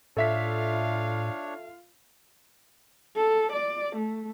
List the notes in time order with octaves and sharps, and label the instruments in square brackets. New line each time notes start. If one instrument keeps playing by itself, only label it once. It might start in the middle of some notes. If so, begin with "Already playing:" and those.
[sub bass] A2 [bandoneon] D4 C#5 [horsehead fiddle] F4 F5 [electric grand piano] A4 E5 B6
[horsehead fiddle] A4
D5
A3